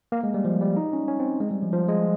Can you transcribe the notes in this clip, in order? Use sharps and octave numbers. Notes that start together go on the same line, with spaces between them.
A#3
G#3
G3
F3
G3
D#4
C#4
C#4
C4
G#3
G3
F3
F3
G#3